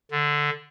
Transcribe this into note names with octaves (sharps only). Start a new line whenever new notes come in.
D3